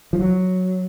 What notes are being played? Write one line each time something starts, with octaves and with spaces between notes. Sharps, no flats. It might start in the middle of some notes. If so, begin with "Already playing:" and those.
F3
F#3